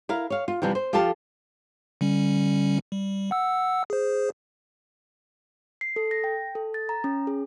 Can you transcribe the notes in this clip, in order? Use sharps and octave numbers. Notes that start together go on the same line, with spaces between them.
E4 A#4 F5
C#5 F5
F4
C3 E3 F3 G3
C5
F3 F4 G4 A4 A5
D3 G3 C#4
G3
F#5 E6
G#4 C5
C7
A4
A#6
G5
A4
A6
A#5
C#4
G#4